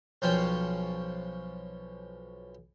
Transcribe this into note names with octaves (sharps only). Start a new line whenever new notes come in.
B1 F3 C#4 C5 G5